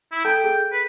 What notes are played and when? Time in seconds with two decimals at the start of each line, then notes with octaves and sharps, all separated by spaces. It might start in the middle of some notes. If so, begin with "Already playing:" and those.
0.12 E4
0.25 A4 G5 A5
0.44 G#4
0.72 B4